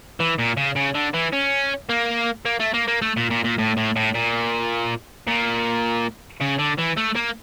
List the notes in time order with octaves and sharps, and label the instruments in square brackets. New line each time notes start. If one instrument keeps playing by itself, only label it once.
[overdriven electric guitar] E3
A#2
C#3
C#3
D3
E3
C#4
A#3
A#3
A3
A#3
A#3
A3
A#2
A#2
A#2
A2
A2
A2
A#2
A#2
C#3
D3
E3
A3
A#3